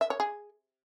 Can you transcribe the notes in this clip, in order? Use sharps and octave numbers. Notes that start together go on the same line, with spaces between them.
E5
C#5
G#4